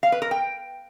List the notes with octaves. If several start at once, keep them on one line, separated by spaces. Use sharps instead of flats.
F5
B4
A#4
G5